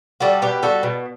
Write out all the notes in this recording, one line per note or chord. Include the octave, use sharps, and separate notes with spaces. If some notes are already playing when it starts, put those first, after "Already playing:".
G3 F#4 A4
B2 G4 B4
G3 F#4 A4
B2